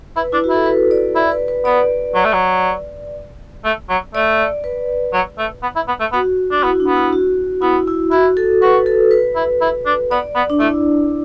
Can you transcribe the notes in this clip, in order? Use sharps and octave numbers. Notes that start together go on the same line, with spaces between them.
E4 B4
D4 E4
F#4
E4 A4
B4
D5
E4 D5
B4
B4
B3 D5
F#3
A3
F#3
A3
F#3
A3 D5
B4
F#3
A3
B3
E4
B3
A3
B3 F#4
D4
F#4
B3 E4
D4
B3
E4
F#4
B3 E4
E4
E4 F#4
A4
F#4 B4
A4
B4
E4
E4
D4
B3 D5
B3
D4
A3 E4